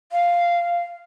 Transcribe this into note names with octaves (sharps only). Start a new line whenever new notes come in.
F5